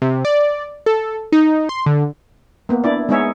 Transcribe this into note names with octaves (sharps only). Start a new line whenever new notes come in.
C3
D5
A4
D#4
C6
D3
A#3 B3
D4 E4 D5
G#3 B3 D#4 G#4 C#5 E5